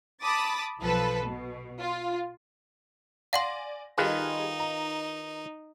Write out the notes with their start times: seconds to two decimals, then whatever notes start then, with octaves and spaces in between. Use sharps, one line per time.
0.23 A5 B5 D6 D#6 A6
0.81 B1 F3 A4 B4
1.25 B2
1.80 F4
3.33 D5 F5 F#5 G#5 C6 A#6
3.98 D#3 G3 D#4 F4 G#4 B4
4.59 A#5